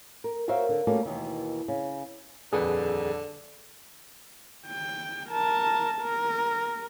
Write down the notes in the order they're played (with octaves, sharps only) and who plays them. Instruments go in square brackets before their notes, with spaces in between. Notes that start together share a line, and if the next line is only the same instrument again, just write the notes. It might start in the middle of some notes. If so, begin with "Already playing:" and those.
[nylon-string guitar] A#4
F#4 A#4 C5 C#5 E5 F5
D3
G3 A3 A#3 C#4 F#4
D#2 B2 D#3 E3
C#3
[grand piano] D#1 F2 B4 [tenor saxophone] D3 [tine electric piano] G#4
[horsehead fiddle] G5
A#4 A5
A#4